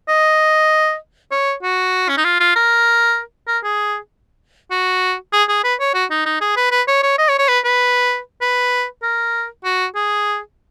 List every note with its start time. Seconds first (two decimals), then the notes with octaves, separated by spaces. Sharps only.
0.09 D#5
1.31 C#5
1.63 F#4
2.09 C#4
2.17 D#4
2.25 F4
2.40 F4
2.56 A#4
3.48 A#4
3.64 G#4
4.71 F#4
5.33 G#4
5.48 G#4
5.64 B4
5.80 C#5
5.94 F#4
6.10 D#4
6.26 D#4
6.41 G#4
6.56 B4
6.71 B4
6.88 C#5
7.03 C#5
7.18 D#5
7.28 C#5
7.39 C#5
7.49 B4
7.65 B4
8.41 B4
9.03 A#4
9.64 F#4
9.95 G#4